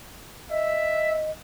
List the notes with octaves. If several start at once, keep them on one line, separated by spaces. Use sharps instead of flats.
D#5 E5